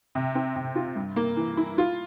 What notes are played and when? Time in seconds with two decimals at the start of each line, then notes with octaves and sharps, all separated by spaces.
0.15 C3
0.35 C4
0.56 C3
0.75 F4
0.96 G2
1.16 A#3
1.36 E3
1.57 E4
1.78 F4